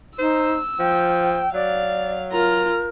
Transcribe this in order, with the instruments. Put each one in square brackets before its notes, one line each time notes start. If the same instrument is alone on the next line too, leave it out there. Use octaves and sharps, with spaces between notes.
[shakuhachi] D#4 [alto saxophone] C5 [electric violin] E6
[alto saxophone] F3 [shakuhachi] G5
[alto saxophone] F#3 [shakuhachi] D5 [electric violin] F5
[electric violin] F4 A#5 [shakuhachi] A#4